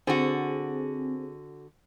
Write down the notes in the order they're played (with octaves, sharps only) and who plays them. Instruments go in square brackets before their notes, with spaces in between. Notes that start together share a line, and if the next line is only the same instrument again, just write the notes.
[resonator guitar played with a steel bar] D3 F#4 [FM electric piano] C4 G#4